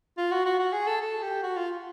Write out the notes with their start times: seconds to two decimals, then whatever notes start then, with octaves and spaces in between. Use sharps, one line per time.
0.18 F4
0.32 F#4
0.45 F#4
0.59 F#4
0.73 G#4
0.87 A4
1.01 A4
1.22 G4
1.43 F#4
1.57 F4